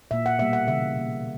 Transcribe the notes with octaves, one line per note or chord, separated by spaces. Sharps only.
A#2 A#3 E5
F#5
B2 G3 A#3 E5
F#5
C#3 E3 G3 E5
B2 A#3